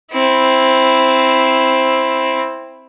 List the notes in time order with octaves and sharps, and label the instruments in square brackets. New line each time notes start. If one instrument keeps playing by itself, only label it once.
[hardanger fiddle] C4 E4